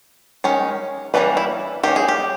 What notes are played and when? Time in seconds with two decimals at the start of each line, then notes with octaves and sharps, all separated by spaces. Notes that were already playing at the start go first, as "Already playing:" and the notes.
0.44 D#3 G#3 C#4
1.14 E3 G3 A#3 C#4 B4
1.37 E4
1.83 D#3 A#3 C#4 G4
1.96 G#4
2.08 G4